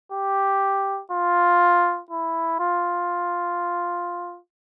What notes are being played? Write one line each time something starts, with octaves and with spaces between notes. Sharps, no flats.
G4
F4
E4
F4